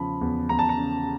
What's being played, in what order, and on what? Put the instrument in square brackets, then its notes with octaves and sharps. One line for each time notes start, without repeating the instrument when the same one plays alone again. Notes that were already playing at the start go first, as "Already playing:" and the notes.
Already playing: [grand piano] E2 C#3 F3 B5
E2
E2 A#5
A5
A#5
C#3